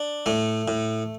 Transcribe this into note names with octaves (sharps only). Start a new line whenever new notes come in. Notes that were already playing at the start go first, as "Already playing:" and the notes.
Already playing: D4
A2 A3
A2